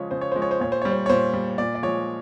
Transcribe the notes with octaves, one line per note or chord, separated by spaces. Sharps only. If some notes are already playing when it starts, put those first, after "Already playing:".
Already playing: C#3 F3 G#3 C#5
C#3 C5
C#5
F3 G#3 C5
C#5
C5
A#2 C#5
C5
G3 C#5
C5
C#5
A#2 C5
G3
A#2 D5
D5
F3 G#3 C#5